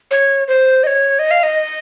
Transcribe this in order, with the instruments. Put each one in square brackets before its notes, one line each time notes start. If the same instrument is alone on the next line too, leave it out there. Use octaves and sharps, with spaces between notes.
[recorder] C#5
C5
D#5
C#5
D#5
F5
D#5